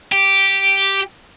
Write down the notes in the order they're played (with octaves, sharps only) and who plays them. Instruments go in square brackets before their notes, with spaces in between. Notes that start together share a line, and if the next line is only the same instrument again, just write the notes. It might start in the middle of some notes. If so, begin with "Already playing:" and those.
[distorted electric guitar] G4